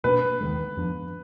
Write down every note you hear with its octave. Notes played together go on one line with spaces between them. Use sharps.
B2 A#3 D4 B4
D#2 D#3 G#3
F2 F3 B3 D4